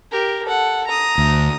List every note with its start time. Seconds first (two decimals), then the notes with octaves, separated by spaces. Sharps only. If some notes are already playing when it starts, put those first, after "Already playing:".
0.11 G4 A#4
0.45 A4 F#5
0.87 A#5 D#6
1.18 D2